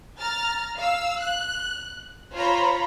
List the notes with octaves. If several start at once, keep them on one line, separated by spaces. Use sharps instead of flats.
A#5 F6 A6
F5 E6
F#6
F4 C5 C#5 A#5 B5